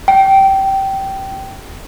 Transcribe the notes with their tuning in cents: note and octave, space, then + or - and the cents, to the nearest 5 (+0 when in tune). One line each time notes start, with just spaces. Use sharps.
G5 -15